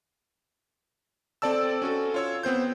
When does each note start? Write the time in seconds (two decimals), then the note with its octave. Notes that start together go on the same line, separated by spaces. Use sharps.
1.42 C4 A4 D5 A5 E6
1.82 C#4 F#4 A4
2.14 F4 C#5 E6
2.43 B3 C4 C5 G6